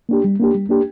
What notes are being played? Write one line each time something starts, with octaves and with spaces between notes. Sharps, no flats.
A#3 D4 G4
G3
A#3 D4 G4
G3
A#3 D4 G4